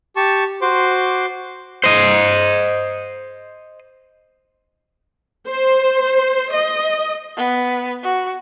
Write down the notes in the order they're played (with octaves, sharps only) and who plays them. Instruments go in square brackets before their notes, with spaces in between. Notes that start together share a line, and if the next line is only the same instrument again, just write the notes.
[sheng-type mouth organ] G4 A5 C#6
F#4 C5 C6 D6
[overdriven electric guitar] C5 D#5
[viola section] C5
D#5
[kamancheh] B3 B4
F#4